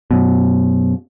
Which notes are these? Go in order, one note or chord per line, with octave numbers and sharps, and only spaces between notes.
F#2 B2